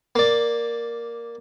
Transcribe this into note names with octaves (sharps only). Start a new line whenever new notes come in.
A#3 D5